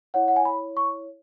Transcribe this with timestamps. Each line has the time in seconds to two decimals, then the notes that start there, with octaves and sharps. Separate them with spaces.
0.14 E4 C#5 F#5
0.28 F#5
0.36 G#5
0.45 B5
0.77 C#6